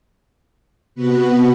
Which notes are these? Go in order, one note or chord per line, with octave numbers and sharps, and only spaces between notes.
C3 B3 F#4 B4